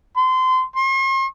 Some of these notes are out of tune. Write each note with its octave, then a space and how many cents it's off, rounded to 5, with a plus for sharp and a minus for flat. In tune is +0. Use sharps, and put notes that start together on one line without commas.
C6 -25
C6 +45